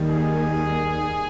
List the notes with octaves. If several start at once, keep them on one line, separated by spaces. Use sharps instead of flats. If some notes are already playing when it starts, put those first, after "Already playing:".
Already playing: D#2 D#3 G3 A#3
G#4